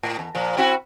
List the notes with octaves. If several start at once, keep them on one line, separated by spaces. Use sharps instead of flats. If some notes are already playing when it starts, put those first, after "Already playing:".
A2
E2
A#2 F3
C4 E4 F#4